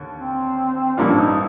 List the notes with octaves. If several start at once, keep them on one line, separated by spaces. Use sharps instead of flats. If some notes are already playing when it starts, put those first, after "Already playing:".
Already playing: D#2 D3
C4
A1 G2 F3 A#3 D4 F4
D#4